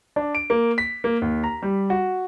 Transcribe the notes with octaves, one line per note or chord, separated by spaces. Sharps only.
D4
D7
A#3
B6
A#3
D#2
A#5
G3
F#4